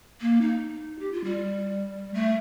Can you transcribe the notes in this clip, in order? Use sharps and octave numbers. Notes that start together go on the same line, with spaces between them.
A#3
D#4
G4
F4
G3
A3